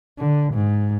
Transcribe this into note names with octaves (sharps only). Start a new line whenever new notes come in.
D3
G#2